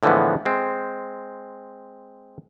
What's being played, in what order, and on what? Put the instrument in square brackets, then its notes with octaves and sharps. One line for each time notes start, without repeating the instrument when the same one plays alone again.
[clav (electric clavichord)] A2 D3 E3 F3 G#3 B3
G#3 C4